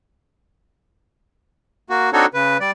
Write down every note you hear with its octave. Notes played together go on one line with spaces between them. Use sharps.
A#3 F#4
C4 D4 D#4 F#4 A4 C#5
C#3 B4
G3 D5